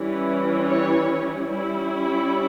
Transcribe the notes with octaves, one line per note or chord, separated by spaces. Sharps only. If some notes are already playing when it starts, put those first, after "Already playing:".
Already playing: E3 G3 C#4 E4
C#5
G3 C#4 E4